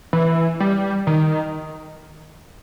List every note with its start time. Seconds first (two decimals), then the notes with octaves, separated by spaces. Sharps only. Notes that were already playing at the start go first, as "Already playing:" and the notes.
0.13 E3
0.60 G3
1.07 D#3